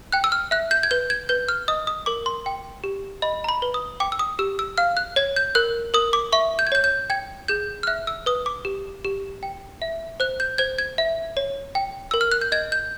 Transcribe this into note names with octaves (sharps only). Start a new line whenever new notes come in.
G5 F#6
E6
F6
E5 F#6
G6
G#6
B4 G6
G#6
B4 G6
F6
D#5 D#6
D#6
A#4 D6
C6
G5
G4
D#5 B5
A#5
B5
B4
D#6
G5 D6
E6
D#6
G4 E6
E6
F5 F6
F#6
C#5 G#6
G6
A#4 F#6
A#4 D#6
D6
E5 C#6
G6
G#6
C#5 G6
G6
G5 G#6
G#4 G6
F6
E5 F#6
E6
B4 D#6
D6
G4
G4
G5
E5
C5 F#6
G6
C5 G#6
G#6
E5
C#5
G5
A#4 E6
F6
F#6
G6
D#5 G#6
G6